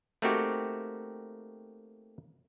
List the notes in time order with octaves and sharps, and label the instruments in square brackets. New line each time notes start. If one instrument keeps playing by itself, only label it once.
[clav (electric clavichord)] A3 A#3 C4 D#4 F#4 G4